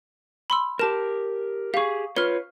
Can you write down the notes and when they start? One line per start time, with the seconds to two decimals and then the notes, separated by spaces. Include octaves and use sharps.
0.50 B5 C6 E6
0.79 G4 A#4 A5 E7
1.74 G4 G#4 F5 C#6
2.16 F4 B4 C#5 F6 G7